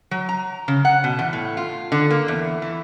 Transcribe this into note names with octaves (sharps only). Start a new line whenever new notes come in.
F#3
A#5
C#3
F#5
B2
E2
A2
F4
D3
A#3
E2
E3